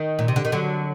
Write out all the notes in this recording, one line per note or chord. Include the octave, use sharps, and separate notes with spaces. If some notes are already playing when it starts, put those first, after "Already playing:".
Already playing: D#3
A#2
C3
D3
D#3
D3 F#3